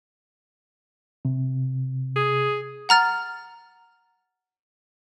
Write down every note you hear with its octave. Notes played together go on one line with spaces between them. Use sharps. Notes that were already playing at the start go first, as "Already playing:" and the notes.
C3
G#4
F#5 A#5 F6 A6